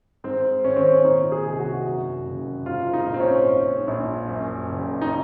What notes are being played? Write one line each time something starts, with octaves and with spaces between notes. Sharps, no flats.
G#2 C4
G#1 C#4
C4
C#4
A#2 D#4
G#4
C2
F#4
F#2
F#1
G#2 F4
D#4
A#1
C4
C#4
G#2
A#1
F#2
F#1
D#4